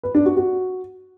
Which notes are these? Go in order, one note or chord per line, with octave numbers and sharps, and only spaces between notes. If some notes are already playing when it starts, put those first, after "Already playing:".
B4
D4
F#4
F#4